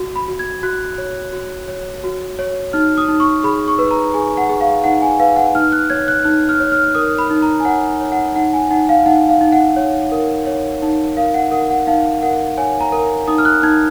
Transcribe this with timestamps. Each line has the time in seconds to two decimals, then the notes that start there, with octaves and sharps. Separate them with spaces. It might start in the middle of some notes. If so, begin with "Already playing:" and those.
Already playing: F#4
0.16 B5
0.28 F#4
0.39 G#6
0.63 F#4 F#6
0.98 C#5
1.33 F#4
1.68 C#5
2.04 F#4
2.39 C#5
2.73 D#4 F6
2.98 D#6
3.08 D#4
3.20 C#6
3.44 G#4 B5
3.68 C#6
3.78 B4
3.91 A#5
4.14 G#4 G#5
4.37 F#5
4.49 G#4
4.61 F5
4.84 D#4 F#5
5.02 G#5
5.19 B4 F5
5.37 F#5
5.55 D#4 F6
5.72 F#6
5.90 C#5 G#6
6.08 F#6
6.24 D#4 F#6
6.49 F6
6.60 C#5
6.72 F6
6.95 A#4 D#6
7.18 B5
7.30 D#4
7.42 A#5
7.60 G#5
7.65 C#5 F#5
8.01 C#5
8.12 F#5
8.36 D#4 F#5
8.53 G#5
8.71 D#4 F#5
8.89 F5
9.06 D#4 F#5
9.29 F5
9.41 D#4
9.52 F#5
9.76 C#5
10.12 A#4
10.47 C#5
10.82 D#4
11.17 A#4 F5
11.34 F#5
11.52 A#4 F#5
11.70 F#5
11.87 D#4 F5
12.22 A#4 F#5
12.57 C#5 G#5
12.81 A#5
12.92 A#4
13.28 D#4 D#6
13.38 F6
13.45 F#6
13.63 D#4 G#6